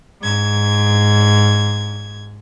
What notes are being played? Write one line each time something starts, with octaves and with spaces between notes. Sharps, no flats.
G#2 G#6